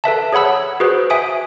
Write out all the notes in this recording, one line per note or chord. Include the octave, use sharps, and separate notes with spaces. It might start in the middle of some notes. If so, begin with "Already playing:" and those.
A4 B4 E5 A5
G#4 C#5 F#5 B5 E6
F#4 G#4 B4 C5
E5 G#5 D#6 D7